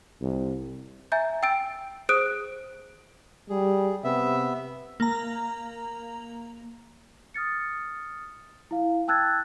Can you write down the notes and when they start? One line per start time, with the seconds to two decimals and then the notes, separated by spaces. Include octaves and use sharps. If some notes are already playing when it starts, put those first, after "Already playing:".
0.21 C2
1.12 E5 G#5 A#5 G6
1.43 G5 E6 A6 D7
2.09 G#4 C5 D#6 F#6 D7
3.49 G3 G#4
4.04 C3 B3 E5
5.00 A#3 A#5
7.34 D#6 F6 A6 C#7
8.71 E4 F5
9.08 G5 A5 E6 F#6 G#6 A6